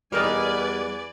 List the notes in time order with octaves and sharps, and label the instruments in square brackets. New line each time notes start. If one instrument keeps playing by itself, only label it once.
[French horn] E2 [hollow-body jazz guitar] G3 A#4 D#5 [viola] B4 G#5 [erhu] D5